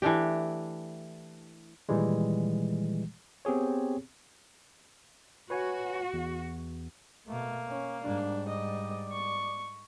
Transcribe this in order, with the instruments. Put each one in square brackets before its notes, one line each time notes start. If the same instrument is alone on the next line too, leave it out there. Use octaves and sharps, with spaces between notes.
[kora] E3 A3 D4 G4
[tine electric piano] A#2 D#3 E3 G3 G#3
B3 C4 G4 G#4 C#5
[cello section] F#4 [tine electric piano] B4 C#5 G#5
[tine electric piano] E2
[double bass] B2 A3 [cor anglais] A#3
[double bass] C#4
[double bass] G#2 G3 [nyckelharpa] D4
[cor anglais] D5 [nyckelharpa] D#5
[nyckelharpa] C#6